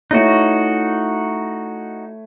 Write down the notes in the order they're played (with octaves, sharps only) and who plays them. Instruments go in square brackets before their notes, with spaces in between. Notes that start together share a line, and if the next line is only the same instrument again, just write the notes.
[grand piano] A3 E4 C#5 [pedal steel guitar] D#4 F#4